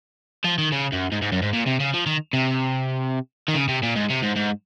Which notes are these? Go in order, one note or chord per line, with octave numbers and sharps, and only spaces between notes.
F3
D#3
C#3
F#2
G#2
G#2
F#2
G#2
A#2
C3
C#3
F3
D#3
C3
D#3
C#3
C3
A#2
G#2
C3
G#2
G#2